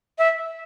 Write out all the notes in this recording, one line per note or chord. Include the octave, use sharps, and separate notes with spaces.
E5